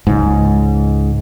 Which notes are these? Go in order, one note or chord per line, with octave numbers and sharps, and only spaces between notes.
C#2 G#2